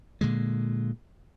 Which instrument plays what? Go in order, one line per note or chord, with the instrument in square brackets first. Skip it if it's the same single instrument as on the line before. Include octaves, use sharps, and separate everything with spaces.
[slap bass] A#2 D3 G#3